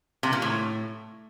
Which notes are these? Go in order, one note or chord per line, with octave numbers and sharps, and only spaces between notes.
C3
A#2
A2